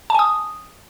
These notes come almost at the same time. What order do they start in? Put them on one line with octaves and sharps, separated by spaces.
A5 G#5 D#6